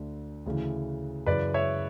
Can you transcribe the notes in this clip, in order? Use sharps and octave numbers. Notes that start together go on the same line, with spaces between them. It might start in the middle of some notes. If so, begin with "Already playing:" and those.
Already playing: D2 D3
D2 C#3 E3
F#2 C#3 E3 B4 D5
C#5 E5